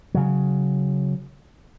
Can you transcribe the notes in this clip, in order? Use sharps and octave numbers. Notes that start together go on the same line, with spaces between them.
C#3 F#3